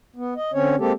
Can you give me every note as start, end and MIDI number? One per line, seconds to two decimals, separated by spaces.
0.16 0.34 59
0.36 0.52 75
0.53 0.76 50
0.53 0.76 60
0.53 0.76 61
0.53 0.76 73
0.78 0.92 56
0.78 0.92 58
0.78 0.92 60
0.78 0.92 67
0.78 0.92 69